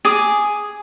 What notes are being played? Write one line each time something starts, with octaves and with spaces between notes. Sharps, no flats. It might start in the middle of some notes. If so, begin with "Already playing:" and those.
G#4 G#5 D6